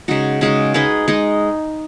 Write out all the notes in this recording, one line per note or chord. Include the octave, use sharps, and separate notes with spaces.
C#3 G#3 D#4 F#4
C#3 G#3 D#4 F#4
G#3 D#4 G#4 B4
G#3 D#4